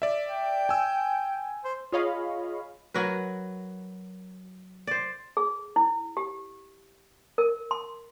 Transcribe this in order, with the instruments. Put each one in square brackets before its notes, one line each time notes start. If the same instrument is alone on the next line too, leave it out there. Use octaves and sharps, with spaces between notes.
[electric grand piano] D5 E5
[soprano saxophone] G5
[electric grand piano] G#5 E6
[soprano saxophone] C5
[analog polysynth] F4 G#4 C#5 D#5 F5 B5
[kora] F#3 F#4 A#4 B4
C5 D5
[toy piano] G#4
E4
G4
A#4
C6